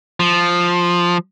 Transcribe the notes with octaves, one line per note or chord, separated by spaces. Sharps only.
F3